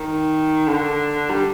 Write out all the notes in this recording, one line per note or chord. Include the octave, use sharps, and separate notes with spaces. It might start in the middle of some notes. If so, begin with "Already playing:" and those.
Already playing: D#3
D3
G3